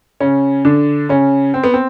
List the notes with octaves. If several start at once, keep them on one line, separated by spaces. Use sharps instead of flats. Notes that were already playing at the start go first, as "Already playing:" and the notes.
C#3 C#4
D3 D4
C#3 C#4
C4
B3
C4